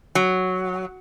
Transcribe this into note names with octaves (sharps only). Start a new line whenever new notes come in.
F#3